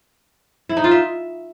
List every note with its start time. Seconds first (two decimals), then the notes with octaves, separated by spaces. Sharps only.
0.69 E4
0.77 D#4
0.84 F4
0.91 E5